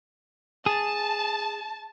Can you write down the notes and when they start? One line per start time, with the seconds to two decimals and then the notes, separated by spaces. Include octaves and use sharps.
0.66 G#4 A5